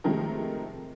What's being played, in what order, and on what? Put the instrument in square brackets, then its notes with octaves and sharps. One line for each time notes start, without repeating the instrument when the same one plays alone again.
[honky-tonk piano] C3 D#3 F3 G#3 A3 A#4